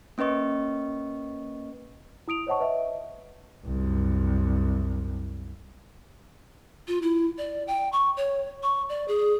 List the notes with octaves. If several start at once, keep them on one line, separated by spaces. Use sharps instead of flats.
A#3 C#4 B4 D#5 C#6
E4 D#6 D7 F7
C5 C#5 D#5 F#5 A5 C#6
B4 D#5 E5
C2 F#2
F4
E4
D5
G5
C#6
C#5
C#6
D5
G#4